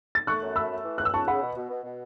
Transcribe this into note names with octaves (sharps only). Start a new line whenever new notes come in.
A6
A3 C#6 F#6
F#2
A3 B5 E6
A3
E3
C#2 F#6
E6
C#2 A5 C#6
C#3 F#5 B5
B2
B2
B2
B2